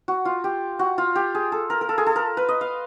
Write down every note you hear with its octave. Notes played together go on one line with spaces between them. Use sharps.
F#4
F4
G4
F#4
F4
G4
G#4
A4
A#4
A#4
A4
G#4
A4
A#4
B4
D#5
F5